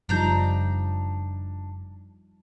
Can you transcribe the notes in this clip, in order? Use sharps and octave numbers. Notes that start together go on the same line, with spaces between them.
F#1 F3 G3 D4 D#4 A#5 G6